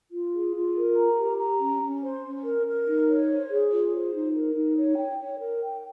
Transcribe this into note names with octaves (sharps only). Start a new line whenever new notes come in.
F4
G#4
F4
A#4
A#5
G4
A#5
C#4
C#4
C5
C#4
A#4
A#4
D#4
C#5
C5
G#4
F4
C5
D#4
A#4
D#4
C#5
G5
C#5
A#4
G5